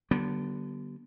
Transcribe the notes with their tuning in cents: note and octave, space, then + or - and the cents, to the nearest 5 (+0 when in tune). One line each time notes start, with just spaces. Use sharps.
D3 +0 G3 -45 B3 -30